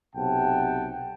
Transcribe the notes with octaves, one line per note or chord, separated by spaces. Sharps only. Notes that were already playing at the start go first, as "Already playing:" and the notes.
B1 C3 F#5 G5 A5